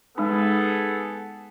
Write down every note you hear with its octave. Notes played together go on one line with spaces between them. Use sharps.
G#3 B3 D#4 G#4 A4